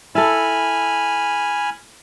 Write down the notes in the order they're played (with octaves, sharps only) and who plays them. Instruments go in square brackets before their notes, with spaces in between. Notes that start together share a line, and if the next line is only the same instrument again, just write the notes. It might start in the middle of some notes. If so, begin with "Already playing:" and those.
[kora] E4 A4 [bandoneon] G#5 B5 F6